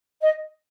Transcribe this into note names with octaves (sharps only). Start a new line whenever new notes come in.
D#5